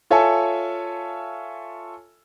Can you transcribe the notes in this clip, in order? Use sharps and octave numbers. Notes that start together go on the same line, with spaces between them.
F4 A4 C#5 E5 G#5 A5